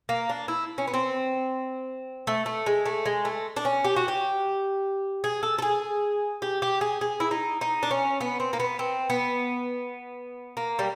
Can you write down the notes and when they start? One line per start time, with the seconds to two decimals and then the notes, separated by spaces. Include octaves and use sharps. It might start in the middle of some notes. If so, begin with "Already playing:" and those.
0.09 A#3
0.29 D4
0.48 E4
0.78 C#4
0.88 B3
0.94 C4
2.27 A3
2.46 A3
2.66 G#3
2.86 A3
3.06 G#3
3.25 A3
3.56 D4
3.65 C#4
3.84 G4
3.96 F#4
4.08 G4
5.24 G#4
5.43 A4
5.58 A4
5.62 G#4
6.42 G4
6.62 G4
6.81 G#4
7.01 G#4
7.20 E4
7.31 D#4
7.61 D#4
7.83 D4
7.91 C#4
8.21 B3
8.40 C4
8.53 A#3
8.60 B3
8.79 C4
9.10 B3
10.57 A#3
10.79 G3